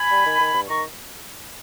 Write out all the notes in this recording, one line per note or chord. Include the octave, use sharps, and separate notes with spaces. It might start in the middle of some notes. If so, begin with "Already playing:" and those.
Already playing: G#5 B5
G3
D#3
D#3
G2
D#3 A#5 C#6